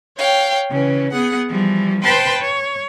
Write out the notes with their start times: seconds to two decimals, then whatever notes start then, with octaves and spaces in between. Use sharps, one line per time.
0.16 C#5 F5 G5
0.69 C#3 E3 C#4
1.12 B3 G#4 F#5
1.48 E3 F3 G3
2.03 B4 C5 G5 A5 B5 C6
2.40 C#5